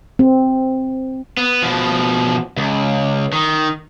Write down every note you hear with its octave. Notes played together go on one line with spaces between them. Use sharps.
C4
B3
B2 F3
C#2
D#3